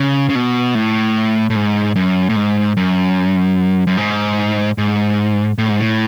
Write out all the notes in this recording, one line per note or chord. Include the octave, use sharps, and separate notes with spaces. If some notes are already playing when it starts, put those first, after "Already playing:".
Already playing: C#3
C#3
B2
A2
A2
G#2
F#2
A2
G#2
F#2
F#2
G#2
G#2
A2
G#2
A2